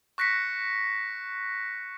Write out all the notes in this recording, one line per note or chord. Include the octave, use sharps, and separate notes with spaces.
C#6 F#6 A#6 B6 C#7